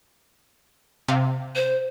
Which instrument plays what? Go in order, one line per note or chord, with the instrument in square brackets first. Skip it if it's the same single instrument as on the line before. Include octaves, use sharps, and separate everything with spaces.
[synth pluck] C3 F5
[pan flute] C5